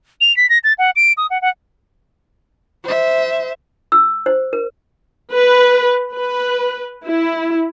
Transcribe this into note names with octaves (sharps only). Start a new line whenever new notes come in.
F7
B6
A#6
A6
F#5
D7
D#6
F#5
F#5
C5 E5
E6
C5
A#4
B4
B4
E4